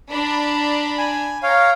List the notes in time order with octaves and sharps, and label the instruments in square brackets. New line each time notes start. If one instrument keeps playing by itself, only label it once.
[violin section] D4 A#5 B5
[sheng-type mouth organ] G#5
[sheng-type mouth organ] C#5 F5 [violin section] G5 A#5